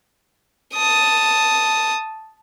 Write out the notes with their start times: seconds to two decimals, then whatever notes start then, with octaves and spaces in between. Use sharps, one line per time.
0.75 A5 D#6